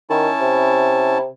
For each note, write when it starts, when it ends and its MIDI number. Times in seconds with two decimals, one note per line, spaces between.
0.10 0.29 51
0.10 1.18 61
0.10 1.18 64
0.10 1.18 81
0.40 1.27 48